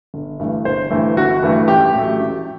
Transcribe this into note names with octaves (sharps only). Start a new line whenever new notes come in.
G1
G2 E3 A3
G1 C5
G2 E3 A3
G1 F#4
G2 E3 A3
A1 G4
A2 F#3 A3
A1